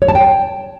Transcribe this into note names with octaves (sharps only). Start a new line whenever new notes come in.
C#5
A5
G5